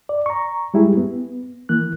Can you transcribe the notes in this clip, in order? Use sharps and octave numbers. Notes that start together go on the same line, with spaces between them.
D5
A#5 C#6
G3 G#3 E4 G4 G#4
B3
E3 A#3 F#6